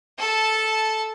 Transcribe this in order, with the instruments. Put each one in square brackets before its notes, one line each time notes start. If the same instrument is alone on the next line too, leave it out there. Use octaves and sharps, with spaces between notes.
[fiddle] A4 A5